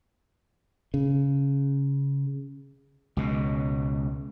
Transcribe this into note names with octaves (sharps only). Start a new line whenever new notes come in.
C#3
C#2 B2